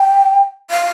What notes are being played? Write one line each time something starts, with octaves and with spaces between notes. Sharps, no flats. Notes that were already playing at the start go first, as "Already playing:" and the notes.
Already playing: G5
F5